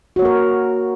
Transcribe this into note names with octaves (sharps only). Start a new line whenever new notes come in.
A#3 F#4 A#4 C#5